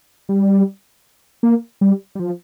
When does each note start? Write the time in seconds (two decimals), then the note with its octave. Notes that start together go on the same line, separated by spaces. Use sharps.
0.29 G3
1.43 A#3
1.81 G3
2.15 G3
2.19 F3